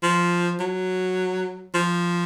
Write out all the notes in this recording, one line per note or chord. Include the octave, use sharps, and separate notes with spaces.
F3
F#3
F3